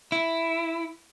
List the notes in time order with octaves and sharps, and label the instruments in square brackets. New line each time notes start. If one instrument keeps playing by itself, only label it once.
[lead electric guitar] E4